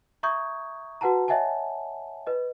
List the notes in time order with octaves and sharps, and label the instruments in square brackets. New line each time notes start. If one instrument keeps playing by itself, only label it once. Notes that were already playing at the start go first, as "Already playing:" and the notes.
[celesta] E5 A#5 C#6 D#6 G6 G#6
F#4 B4 F#5 A5 A#5
C#5 D#5 E5 F#5 G#5 A5
B4 D#5